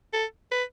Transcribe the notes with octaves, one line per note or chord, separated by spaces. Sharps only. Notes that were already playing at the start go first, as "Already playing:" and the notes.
A4
B4